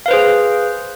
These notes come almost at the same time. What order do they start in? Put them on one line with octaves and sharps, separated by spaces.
F5 B4 C5 G#4